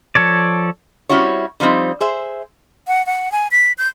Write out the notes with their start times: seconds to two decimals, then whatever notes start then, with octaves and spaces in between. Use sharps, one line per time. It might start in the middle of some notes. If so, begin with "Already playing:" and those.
0.15 F3 A4 C#5 D5
1.09 G3 C4 C#4 E4 F#4 C#5
1.60 D3 F3 G3 C4 D#4
2.01 G#4 C5 E5
2.87 F#5
3.06 F#5
3.32 G#5
3.51 B6
3.78 G6